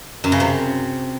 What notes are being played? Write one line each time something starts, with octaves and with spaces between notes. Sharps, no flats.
F#2
C#3
C3